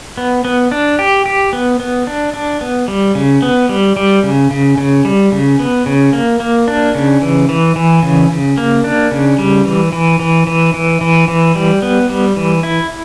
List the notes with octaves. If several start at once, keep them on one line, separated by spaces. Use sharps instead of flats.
B3
B3
D4
G4
G4
B3
B3
D4
D4
B3
G3
C#3
B3
G3
G3
C#3
C#3
C#3
G3
C#3
B3
C#3
A#3
A#3
D4
C#3
E3
E3
E3
C#3
C#3
A#3
D4
C#3
G3
E3
E3
E3
E3
E3
E3
E3
G3
B3
G3
E3
E4